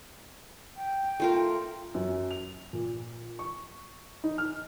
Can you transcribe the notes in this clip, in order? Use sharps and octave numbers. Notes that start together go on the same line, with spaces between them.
G5
A3 F4 A#4
F#2
F7
A#2
C#6
D#4
F6